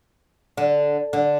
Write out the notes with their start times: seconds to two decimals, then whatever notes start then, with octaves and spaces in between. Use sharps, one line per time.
0.57 D3
1.13 D3